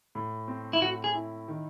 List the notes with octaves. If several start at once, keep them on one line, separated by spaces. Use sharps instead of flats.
A2
C4
E4
A2 F#4
G#4
E4
D#3